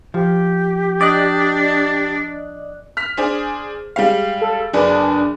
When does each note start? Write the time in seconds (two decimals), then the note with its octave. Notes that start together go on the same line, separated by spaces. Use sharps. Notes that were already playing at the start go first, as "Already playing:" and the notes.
0.14 F3 G4
1.01 D4 D5 D#5 F#6
2.97 F6 B6
3.17 D4 G#4 C5
3.96 G3 G#3 F5
4.41 A4
4.73 F#1 D4 G#4 B4